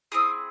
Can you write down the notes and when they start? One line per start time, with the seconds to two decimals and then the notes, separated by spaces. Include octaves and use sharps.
0.12 C4 E4 G#4 D#6